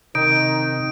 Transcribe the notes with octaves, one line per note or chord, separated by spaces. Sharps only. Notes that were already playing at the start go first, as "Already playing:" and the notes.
C3 D#3 D#4 D7